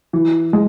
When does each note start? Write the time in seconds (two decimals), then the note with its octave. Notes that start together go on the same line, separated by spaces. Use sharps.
0.13 E3
0.53 G#3